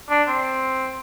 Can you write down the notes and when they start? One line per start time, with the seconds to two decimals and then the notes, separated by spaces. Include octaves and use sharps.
0.10 D4
0.28 C4